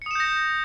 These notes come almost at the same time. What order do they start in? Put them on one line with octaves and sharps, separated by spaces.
C#7 D#6 E7 G6 A#6